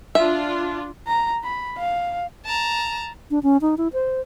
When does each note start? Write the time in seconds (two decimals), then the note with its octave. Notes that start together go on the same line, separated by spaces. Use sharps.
0.15 D4 F4 E5
1.08 A#5
1.44 B5
1.78 F5
2.45 A5 A#5
3.31 D4
3.43 C#4
3.61 D#4
3.78 E4
3.93 C5